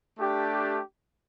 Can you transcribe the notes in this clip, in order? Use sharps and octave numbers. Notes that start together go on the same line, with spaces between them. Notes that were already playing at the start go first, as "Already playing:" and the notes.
A3 D4 G4